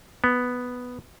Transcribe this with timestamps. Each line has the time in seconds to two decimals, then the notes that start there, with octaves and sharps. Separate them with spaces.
0.24 B3